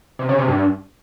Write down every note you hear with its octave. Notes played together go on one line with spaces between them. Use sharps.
C3
C#3
C3
G2